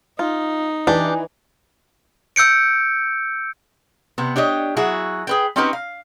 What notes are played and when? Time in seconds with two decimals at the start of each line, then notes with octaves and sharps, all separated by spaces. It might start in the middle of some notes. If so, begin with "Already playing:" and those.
0.19 D#4 F4
0.87 E3 D4 G4 D5
2.36 E6 G6 C#7 D7
4.18 C3 B3
4.36 D4 G4 C#5 D#5
4.77 F#3 E4 F#4 G#4
5.27 G#4 B4 G5
5.56 C4 C#4 D#4 F#4 G4 B4
5.73 F5